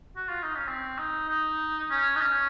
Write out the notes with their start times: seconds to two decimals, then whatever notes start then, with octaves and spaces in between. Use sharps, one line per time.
0.17 F#4
0.29 F4
0.42 D#4
0.55 C#4
0.68 C4
0.98 D#4
1.28 D#4
1.90 C#4
2.16 D#4
2.21 C#4